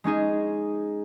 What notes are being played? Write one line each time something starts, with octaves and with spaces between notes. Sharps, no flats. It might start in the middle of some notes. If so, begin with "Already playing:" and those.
G#3 C#4 D#4 G#4